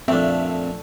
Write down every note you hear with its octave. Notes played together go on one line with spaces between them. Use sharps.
F2 A#2 F3 A3 C4 D4 E5